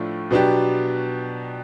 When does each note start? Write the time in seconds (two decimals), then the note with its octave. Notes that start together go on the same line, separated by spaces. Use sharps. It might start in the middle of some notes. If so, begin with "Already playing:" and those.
Already playing: A2 F3 A3 D4 F4
0.31 B2 F#3 B3 D4 G4